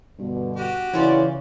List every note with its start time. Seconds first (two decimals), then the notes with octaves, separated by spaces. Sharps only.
0.19 G2 B2 D3
0.56 F#4 G4
0.93 C#3 E3 C#4 F4 D5